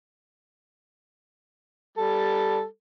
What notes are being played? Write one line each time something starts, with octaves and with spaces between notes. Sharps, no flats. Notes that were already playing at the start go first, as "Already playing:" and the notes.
G3 A4